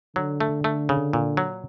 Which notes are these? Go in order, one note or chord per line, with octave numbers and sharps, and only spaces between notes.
D3 F#3
A3
A3
C#3
A#2
F#3